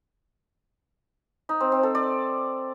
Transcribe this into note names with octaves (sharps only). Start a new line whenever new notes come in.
D#4
C4
C4
A4
D5